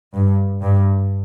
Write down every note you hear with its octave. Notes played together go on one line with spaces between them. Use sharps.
G2
G2